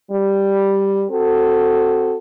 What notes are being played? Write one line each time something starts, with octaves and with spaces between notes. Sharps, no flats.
G3
C4 F#4 A4